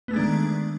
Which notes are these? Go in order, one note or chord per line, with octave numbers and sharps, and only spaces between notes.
D#3 G#3 A3 B3 D4